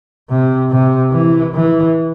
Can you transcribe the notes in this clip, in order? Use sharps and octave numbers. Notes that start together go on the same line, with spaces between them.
C3
C3
E3
E3